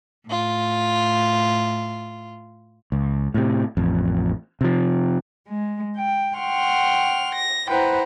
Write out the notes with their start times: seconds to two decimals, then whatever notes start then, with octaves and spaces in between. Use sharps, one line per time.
0.26 A2 F4
2.92 C#2
3.34 A2 C3
3.77 A1 F2
4.61 C3 F3
5.47 G#3
5.96 G5
6.36 F#5 G5 C6 C#6 F6
7.33 A#6
7.67 E4 B4 C5 F#5 G5 A#5